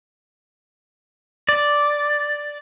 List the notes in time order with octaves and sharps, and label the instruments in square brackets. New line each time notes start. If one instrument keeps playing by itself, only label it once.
[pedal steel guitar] D5